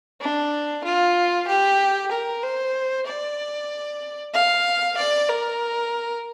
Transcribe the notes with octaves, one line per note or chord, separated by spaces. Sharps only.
D4
F4
G4
A#4
C5
D5
F5
D5
A#4